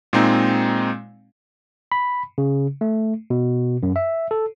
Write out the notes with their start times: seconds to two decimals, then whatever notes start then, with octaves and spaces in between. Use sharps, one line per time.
0.13 A#2 G#3 C4 D#4
1.92 B5
2.38 C#3
2.81 A3
3.30 B2
3.83 F#2
3.96 E5
4.31 A4